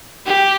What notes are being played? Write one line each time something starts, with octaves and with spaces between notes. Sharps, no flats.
G4